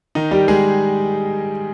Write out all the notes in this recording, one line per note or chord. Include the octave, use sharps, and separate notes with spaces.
D#3 D#4
G3 G4
G#3 G#4